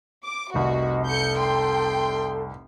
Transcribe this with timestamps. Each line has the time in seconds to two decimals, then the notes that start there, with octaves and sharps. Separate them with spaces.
0.24 D6
0.54 F1 C2 F#4 D#5
1.08 A4 G6 C#7
1.39 G5 C6